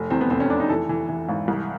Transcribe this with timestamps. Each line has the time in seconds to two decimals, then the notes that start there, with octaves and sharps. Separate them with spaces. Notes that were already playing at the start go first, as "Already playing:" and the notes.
Already playing: F1
0.10 E2 C4
0.21 B3
0.30 F1 C4
0.40 C#4
0.50 F1 D4
0.60 D#4
0.69 E3 A4
0.89 E3
1.09 E3
1.29 G#1
1.48 C2